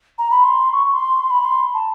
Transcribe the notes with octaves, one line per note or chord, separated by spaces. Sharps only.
A#5
B5
C6
C#6
C6
B5
C6
A5